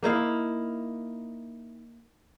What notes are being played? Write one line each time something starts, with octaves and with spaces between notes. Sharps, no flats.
A#3 D#4 E4 F5